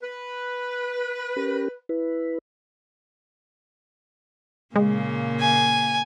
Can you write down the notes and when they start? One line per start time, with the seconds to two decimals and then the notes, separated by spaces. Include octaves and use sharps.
0.01 B4
1.36 C#4 G4 A#4
1.89 E4 B4
4.76 A#2 C#3 G#3 A#3
5.41 G#5